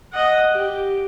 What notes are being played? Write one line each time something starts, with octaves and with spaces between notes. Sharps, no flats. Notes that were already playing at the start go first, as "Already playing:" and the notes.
D#5 F#5
G4